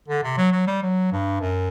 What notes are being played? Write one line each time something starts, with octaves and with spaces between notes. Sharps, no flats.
D3
C3
F#3
F#3
G3
F#3
G2
F#2